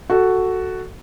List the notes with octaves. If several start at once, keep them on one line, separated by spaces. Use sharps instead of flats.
F#4 A4